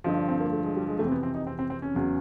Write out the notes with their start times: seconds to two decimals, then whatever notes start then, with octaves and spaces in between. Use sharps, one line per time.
0.04 G2 D3 F3 D#4
0.17 D4
0.28 C4
0.40 A#3
0.52 A3
0.64 G#3
0.76 G3
0.88 G#3
0.99 F2 C3 E3 A3
1.07 C4
1.11 B3
1.23 C4
1.35 D#4
1.47 C4
1.59 C4
1.70 C4
1.82 C#4
1.94 E2 C#3 F#3